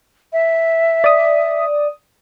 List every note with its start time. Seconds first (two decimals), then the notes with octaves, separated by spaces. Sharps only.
0.33 E5
1.04 D5 D#6